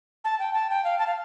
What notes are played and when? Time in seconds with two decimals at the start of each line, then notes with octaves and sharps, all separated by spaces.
0.24 A5
0.39 G5
0.54 A5
0.70 G5
0.84 F5
0.99 A5
1.07 F5